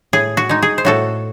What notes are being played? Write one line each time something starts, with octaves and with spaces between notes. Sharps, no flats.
A2 G#4
F#4
G#3 D#4
G#4
C5
A2 F#4 A4